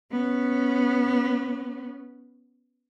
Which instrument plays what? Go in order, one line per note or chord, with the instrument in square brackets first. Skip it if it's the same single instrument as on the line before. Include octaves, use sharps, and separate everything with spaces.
[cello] B3 C#4